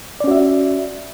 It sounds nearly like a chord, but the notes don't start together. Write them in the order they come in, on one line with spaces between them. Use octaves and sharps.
D5 C#4 F#4 E5